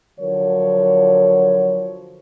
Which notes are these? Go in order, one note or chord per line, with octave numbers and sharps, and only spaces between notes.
D3 F3 F#3 A#4 C#5